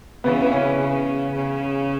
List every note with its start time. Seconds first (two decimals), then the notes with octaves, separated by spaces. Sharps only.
0.24 C#3 E3 B3
0.42 B3
0.52 C#4
0.80 C#3
1.35 C#3